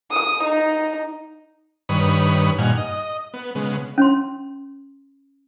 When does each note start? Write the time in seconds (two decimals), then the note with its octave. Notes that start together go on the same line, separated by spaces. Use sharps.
0.11 D#6
0.44 D#4
1.89 G2 D#3 B4 C#5 B5 D#6
2.58 G2 A#2 D#4 F#5 G#5 F6
2.77 D#5
3.34 B3
3.55 C#3 G#3 B3
3.98 C#4 C6